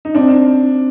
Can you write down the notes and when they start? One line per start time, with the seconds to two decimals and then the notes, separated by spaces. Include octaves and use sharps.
0.05 D#4
0.15 C4 D4